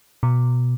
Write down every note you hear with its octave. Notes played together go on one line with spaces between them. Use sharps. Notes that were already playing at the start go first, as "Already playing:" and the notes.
B2